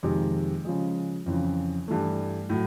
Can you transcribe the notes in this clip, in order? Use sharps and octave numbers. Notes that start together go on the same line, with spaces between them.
F2 C3 D#3 G#3
C#3 F3 G#3
F2 C#3 E3
G2 E3 A3
A2 F#3